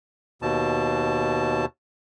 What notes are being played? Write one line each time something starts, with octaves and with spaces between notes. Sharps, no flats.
D#2 B2 A5